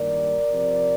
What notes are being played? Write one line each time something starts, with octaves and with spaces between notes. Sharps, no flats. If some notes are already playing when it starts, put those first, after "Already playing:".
Already playing: G2 D#3 G3 A#3 A#4 D5
C3 F3 C4